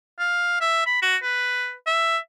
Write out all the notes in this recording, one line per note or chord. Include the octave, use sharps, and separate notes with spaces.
F5
E5
B5
F#4
B4
E5